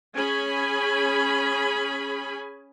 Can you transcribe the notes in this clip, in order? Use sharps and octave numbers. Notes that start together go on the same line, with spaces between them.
C#4 G#4 G#5 B5